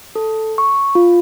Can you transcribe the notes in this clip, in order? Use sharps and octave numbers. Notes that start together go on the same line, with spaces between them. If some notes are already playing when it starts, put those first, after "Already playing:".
A4
C#6
F4